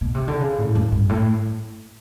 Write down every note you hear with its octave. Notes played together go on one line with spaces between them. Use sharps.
B2
C3
D3
C#3
A2
F#2
G2
A2